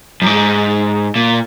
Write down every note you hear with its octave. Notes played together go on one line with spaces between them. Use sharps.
F#2
G#2
A#2